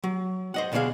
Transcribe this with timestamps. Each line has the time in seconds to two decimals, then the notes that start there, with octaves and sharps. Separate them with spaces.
0.04 F#3
0.54 C5 D#5 F#5
0.72 D2 B2 A3 D4 G#4 F5